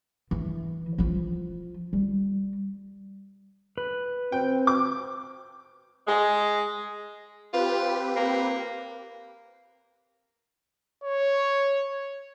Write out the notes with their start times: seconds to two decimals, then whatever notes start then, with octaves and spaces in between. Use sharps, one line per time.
0.31 E3
0.98 F3 F4
1.93 G3
3.78 B4
4.32 C4 G5
4.67 D6
6.07 G#3
7.53 C4 F4 G4 B4
8.16 A#3
11.04 C#5